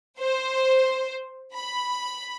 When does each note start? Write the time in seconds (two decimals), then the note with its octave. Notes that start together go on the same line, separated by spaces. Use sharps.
0.19 C5
1.54 B5